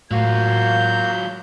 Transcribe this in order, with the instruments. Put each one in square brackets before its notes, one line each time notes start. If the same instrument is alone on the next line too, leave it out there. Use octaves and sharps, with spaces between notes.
[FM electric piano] A2 [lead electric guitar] F#3 F4 [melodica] A#3 F#4 [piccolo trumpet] G6